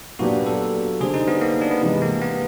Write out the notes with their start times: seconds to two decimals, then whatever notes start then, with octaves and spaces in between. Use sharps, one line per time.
0.19 A#2 F#3 B3 D4 F#4 G4
0.46 A4
1.00 D3 G3 C4 G#4
1.14 D#4
1.28 B3
1.41 A#3
1.62 D4
1.71 B3
1.81 C3 E3 G#3
2.02 A#3
2.21 B3